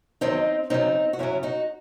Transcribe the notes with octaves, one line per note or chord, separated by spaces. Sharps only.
E2 D#3 F#3 C4 D#4
F#2 C#3 F#3 C4 D#4
F#4
F#2 C#3 F#3 C#4 E4
D#4 F#4